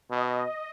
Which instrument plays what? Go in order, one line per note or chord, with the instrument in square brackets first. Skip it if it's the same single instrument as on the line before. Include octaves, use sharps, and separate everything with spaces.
[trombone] B2 [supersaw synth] D#5